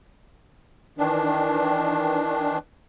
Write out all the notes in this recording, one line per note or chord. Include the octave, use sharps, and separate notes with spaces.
D#3 E3 D4